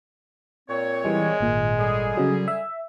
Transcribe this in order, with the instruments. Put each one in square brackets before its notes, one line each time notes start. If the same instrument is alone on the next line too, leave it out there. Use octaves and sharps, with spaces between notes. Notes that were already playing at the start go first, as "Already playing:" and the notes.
[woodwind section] A#2 C4 C#5
[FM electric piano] E3 G3 [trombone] G#3
[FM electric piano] G#1 A#2
[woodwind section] D3 G3 G#4
[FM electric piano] C#3 F#3
E5